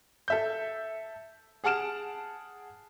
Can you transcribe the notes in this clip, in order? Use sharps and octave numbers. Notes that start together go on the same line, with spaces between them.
A4 E5 G6
G#4 F#5 A5 F6 D7 E7